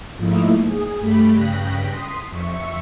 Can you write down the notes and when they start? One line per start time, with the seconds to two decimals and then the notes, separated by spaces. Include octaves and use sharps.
0.16 G#2 F3 A3 A#3 D#4 E4
0.65 G#4
0.98 G2 A3 G4 B5
1.32 G2 C#3 G5 F#6 A#6 B6
1.90 C6 D#6 B6
2.30 F2 E5 C#6